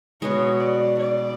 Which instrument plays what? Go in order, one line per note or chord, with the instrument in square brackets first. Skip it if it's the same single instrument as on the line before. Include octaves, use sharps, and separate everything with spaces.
[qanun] B2 G#3 B3 F#4 [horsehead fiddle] C#5
[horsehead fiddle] D5
D5